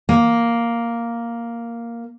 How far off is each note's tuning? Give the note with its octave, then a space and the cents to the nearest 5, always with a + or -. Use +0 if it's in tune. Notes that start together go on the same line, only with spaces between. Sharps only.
A#3 +0